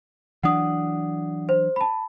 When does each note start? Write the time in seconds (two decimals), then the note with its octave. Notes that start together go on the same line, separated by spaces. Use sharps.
0.44 E3 F#3 D4 F#5 D#6
1.49 C5
1.76 A5 B5